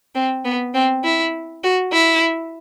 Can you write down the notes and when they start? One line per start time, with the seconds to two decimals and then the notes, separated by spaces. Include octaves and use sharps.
0.15 C4
0.45 B3
0.74 C4
1.04 E4
1.64 F#4
1.93 E4